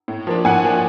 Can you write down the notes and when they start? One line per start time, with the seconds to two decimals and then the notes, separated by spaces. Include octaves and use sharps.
0.08 A2
0.27 F3 A#3 D4
0.45 A2 F#5 G#5
0.64 F3 A#3 D4